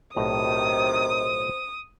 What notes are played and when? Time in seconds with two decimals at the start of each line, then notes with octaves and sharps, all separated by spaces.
0.16 B1 A2 C3 D#3 C5 D#5 D#6